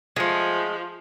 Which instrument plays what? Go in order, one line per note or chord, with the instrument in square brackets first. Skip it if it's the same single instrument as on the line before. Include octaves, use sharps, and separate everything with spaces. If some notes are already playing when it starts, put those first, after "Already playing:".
[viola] F3 [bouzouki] G#3 A3